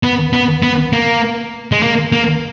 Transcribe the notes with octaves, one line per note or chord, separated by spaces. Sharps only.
B3
B3
B3
A#3
G#3
A#3
A#3